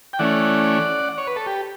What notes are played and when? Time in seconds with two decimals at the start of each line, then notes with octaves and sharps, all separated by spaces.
0.13 G5
0.19 E3 A3 C#4 D5 F#5
1.18 C#5
1.27 B4
1.36 A4
1.46 G4